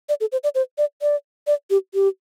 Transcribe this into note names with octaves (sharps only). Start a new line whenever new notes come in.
D5
A4
C5
D5
C5
D5
D5
D5
G4
G4